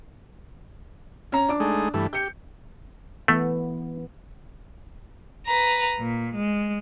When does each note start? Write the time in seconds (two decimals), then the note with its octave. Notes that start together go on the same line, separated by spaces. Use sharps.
1.32 C#4 A#5
1.49 D4 D6
1.60 G#3 A3 D#4
1.94 G2 E3 A3
2.13 G4 G6 C#7
3.28 E3 A3 B3
5.45 B4 A#5
5.98 A#2
6.34 G#3